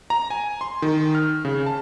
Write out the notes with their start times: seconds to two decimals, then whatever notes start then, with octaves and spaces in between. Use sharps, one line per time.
0.10 A#5
0.30 G#5
0.61 C6
0.82 D#3
1.15 F6
1.45 C#3
1.66 A5